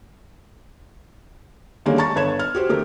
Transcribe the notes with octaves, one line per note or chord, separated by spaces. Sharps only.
D3 D#3 G3 G#3 A#3 C#4
A5 A#5 C#6 A6
G1 B4 C#5 G#6 A6 E7
F6
F#4 G4 C5
D3 A3 G4 A#4